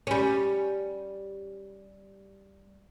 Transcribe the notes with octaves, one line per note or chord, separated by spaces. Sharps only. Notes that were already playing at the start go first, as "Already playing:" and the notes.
G3 C#4